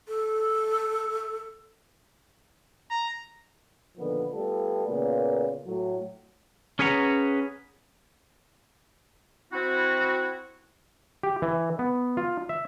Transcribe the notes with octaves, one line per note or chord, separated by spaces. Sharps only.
A4
A#5
A#2 D3 D#3 F3 B3
G3 A3 B3 F4 A4
A#2 C#3 A#3 B3
A2 F#3
C#4 G#4 B4 F#5 A#5
C4 E4 F#4
G4
E3
B3
F4
E5